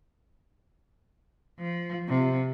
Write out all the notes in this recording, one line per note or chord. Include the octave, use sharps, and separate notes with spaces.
F3
C3 F3